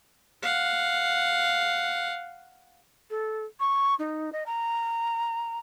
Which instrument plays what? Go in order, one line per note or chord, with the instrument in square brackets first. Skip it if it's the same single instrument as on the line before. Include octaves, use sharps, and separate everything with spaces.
[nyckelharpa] F5 F#5
[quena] A4
C#6
D#4
D#5
A#5